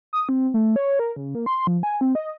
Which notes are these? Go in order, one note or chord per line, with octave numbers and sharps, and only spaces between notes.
D#6
C4
A3
C#5
A#4
C#3
A#3
C6
F3
G#5
C4
D#5